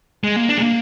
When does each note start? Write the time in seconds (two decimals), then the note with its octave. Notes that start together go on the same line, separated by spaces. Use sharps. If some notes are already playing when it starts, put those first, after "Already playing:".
0.24 G#3
0.36 A#3
0.49 D4
0.57 G#3
0.62 A#3